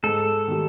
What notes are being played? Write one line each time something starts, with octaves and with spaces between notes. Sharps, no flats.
G#2 A4
D#3 G3